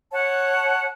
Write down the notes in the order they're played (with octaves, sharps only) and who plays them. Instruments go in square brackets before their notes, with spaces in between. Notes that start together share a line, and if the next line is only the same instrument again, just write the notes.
[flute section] C#5 F#5 A5